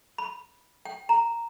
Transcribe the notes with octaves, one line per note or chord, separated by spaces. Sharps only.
B5
G5
A#5